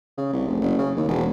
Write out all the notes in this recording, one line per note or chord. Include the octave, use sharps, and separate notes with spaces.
C#3
C2
F1
F#1
C#3
D#2
E1